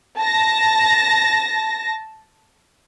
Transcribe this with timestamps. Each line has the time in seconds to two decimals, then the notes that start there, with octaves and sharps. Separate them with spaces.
0.18 A5 A#6